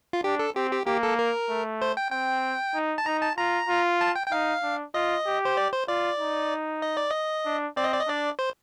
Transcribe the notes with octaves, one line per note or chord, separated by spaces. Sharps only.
F4
D4 G4
A4
C4 G4
G4
A#3 G4
A4
A#4
A3
C5
G5
C4 G5
D#4
A5
D#4 A#5
A5
F4 A#5
F4
A5
G5
G5
D#4 F5
D4
F4 D#5
G4
C5
D5
C5
F4 D5
D#4
D#5
D5
D#5
D4
C4 D5
D#5
D5
D#5
D4 D5
C5